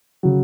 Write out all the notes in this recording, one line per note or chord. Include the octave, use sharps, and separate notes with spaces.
C#3 F#3